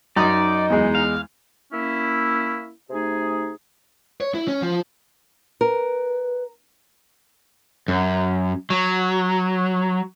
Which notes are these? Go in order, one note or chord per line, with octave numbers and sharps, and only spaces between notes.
F#2 D#4 D5 A#5
E2 G#3
F5
A#3 C#4 E4
C3 A3 D#4 G#4
C#5
E4
C#4
F3
A#4 B4
F#2
F#3